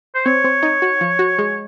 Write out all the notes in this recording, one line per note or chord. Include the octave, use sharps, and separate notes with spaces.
C5
C4 C#5
C4
D#4
F#4
F3
F#4
G#3